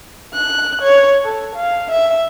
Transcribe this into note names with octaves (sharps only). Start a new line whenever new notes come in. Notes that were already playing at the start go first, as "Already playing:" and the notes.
F#6
C#5
A4
F5
E5